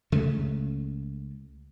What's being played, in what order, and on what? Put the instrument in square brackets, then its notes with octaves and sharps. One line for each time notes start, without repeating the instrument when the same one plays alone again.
[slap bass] C#2 C#3 A3